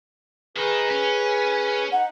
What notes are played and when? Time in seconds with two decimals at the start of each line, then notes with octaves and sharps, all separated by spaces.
0.57 D#3 D#4 G#4 B4
0.90 C#4
1.92 D#4 F#5